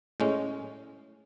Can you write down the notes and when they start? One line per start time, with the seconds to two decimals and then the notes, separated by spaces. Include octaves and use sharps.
0.20 A2 G#3 C#4